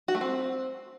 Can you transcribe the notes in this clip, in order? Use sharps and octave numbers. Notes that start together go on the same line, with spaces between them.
F#4
A3
C4